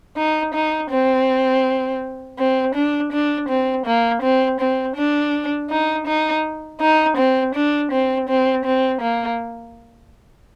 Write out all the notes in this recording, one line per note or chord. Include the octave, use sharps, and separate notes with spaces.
D#4
D#4
C4
C4
D4
D4
C4
A#3
C4
C4
D4
D#4
D#4
D#4
C4
D4
C4
C4
C4
A#3